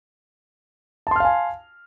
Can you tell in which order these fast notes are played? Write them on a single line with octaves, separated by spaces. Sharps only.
A5 C6 F6 F5 G#5